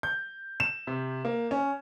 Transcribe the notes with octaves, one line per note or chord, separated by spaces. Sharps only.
G6
E7
C3
A#3
C#4